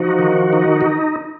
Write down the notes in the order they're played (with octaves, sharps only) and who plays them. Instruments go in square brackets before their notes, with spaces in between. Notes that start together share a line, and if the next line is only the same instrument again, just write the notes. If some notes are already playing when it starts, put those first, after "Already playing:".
Already playing: [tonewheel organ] F3 D#4 F#4
D#3
D#4
F#4